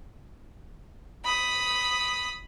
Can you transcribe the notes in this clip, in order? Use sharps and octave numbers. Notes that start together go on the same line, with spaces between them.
B5 D#6